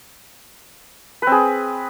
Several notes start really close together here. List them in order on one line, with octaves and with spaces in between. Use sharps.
B4 C4 G#4